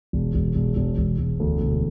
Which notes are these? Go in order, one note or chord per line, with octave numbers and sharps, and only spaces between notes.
E1
E1
E1
E1
E1
E1
D2
E1